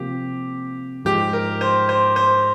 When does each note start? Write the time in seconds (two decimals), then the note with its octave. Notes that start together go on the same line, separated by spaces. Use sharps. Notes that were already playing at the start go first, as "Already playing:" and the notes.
Already playing: C3 F3 A#3 G4
1.05 G#2 F3 G#3 G4
1.33 A#4
1.61 C5
1.89 C5
2.16 C5